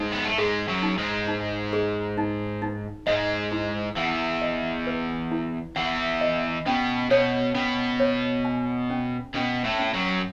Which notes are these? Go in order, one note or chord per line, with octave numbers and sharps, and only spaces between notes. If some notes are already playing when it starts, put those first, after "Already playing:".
Already playing: G#2 G#3 D#4
B3
A3
G#2 G#3 G#4
F#2 F#3
D#4
G#2 G#3
D#4
G#4
D#4
D#4
G#2 G#3 D#5
E4
E2 E3 F#5
D#5
B4
E4
E2 E3 F#5
D#5
B2 B3 C#4
B2 B3 C#5
B2 B3 C#4
C#5
G#5
C#4
B2 B3 C#4
A2 A3
C#4
F#2 F#3